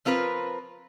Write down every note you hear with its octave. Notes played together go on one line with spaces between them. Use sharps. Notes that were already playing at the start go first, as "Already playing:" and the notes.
F3 C4 F4 A#4 B4